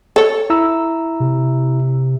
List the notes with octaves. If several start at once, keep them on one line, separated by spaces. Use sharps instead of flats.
A4 C#5
E4 A#5 E6
C3